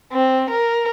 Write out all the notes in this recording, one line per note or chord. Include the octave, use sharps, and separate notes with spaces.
C4
A#4